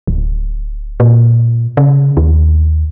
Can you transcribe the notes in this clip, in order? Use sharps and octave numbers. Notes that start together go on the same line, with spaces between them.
D1
A#2
C#3
D#2